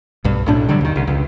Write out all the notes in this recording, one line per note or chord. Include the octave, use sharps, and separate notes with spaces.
B1 G2
B1 A2 D4
D3 F#3 G3
D#2 D#3
C2
C#2